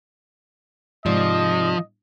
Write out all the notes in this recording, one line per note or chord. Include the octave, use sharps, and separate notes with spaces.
G#2 C3 F3 D5 D#5